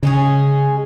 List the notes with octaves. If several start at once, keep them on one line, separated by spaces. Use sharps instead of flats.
C#3 G#3 C#4 G#4